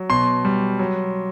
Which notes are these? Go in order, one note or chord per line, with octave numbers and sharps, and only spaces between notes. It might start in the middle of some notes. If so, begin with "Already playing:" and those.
Already playing: F#3
B2 C6
G3
F#3